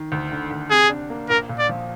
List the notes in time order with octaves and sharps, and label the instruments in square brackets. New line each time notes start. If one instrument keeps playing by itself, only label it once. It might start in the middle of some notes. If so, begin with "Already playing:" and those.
Already playing: [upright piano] D#3
D2
D3
D2
[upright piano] C3 [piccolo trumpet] G#4
[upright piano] D4
A#3
[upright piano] A#1 [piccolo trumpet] A#4
[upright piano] A#2
[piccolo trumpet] D5
[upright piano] F3